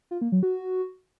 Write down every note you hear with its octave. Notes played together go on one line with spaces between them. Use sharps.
F4
A#3
F#3
F#4